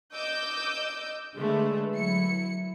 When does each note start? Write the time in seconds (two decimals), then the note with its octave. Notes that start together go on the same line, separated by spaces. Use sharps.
0.14 D#5 D6 E6 G6
1.38 D3 G#3 A3 B4
1.95 F#3 E4 C#7